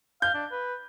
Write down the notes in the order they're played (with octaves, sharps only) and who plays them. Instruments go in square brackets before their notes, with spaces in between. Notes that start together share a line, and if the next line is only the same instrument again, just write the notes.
[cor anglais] F5 [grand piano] G6
[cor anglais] D4
B4